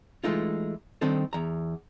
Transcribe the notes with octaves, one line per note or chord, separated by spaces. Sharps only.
E3 G#3 A3 D#4 F4
D#3 G3 C4 D4 D#4 A4
E2 A#5